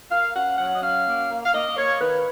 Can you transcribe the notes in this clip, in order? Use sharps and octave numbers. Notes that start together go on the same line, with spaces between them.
A#3 F5
C#4 F#5
F#3 F#5
D#5
C#4 F5
A#3
A#3
F5
A#3 D#5
A#3 C#5
D#3 B4